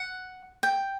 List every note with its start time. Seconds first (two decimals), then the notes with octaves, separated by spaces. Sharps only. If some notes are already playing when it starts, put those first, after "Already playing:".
Already playing: F#5
0.63 G5